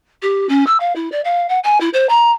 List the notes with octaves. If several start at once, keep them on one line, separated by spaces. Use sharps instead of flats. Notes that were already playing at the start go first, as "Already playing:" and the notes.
G4
C#4
E6
F5
E4
D5
F5
F#5
G#5
E4
C5
A#5